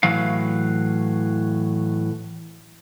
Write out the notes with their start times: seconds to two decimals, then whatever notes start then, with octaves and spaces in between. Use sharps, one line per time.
0.03 A2 E3 F#3 F5